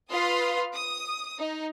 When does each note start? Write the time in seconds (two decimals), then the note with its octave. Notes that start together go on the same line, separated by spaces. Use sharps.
0.10 F4 B4 F5 C6 D#6
0.74 D#6
1.39 D#4